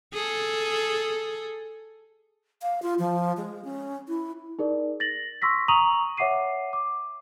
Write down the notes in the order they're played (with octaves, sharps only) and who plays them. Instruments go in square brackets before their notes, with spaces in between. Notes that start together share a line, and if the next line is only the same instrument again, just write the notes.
[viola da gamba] G#4 A4
[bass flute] F5
F4
F3
G#3
C#4
E4
[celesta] D#4 G#4 A#4 D5
A6 A#6 F#7
C6 C#6 E6 A#6 B6
A#5 C#6 D#6 D#7 F7 F#7
C#5 E5 F#5 D6 C7 D#7
D6